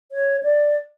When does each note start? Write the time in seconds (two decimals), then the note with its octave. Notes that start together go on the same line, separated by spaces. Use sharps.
0.12 C#5
0.43 D5